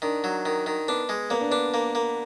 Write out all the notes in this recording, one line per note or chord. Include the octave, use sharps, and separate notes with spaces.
D#3 D4
F#3
D#3
D#3
B3 D4
G#3
A#3 B3
D4
B3 D4
A#3
A#3